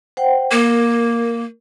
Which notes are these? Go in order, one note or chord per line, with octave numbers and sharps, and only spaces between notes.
C5 F#5 G5
A#3 A#4